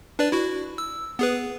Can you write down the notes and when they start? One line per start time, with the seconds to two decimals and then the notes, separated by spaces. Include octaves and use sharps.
0.19 D4 B4 D5
0.32 E4 F#4
0.78 E6
1.19 B3 G#4 B4